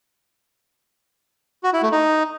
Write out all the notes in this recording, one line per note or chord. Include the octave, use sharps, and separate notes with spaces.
F#4
E4
A3
D#4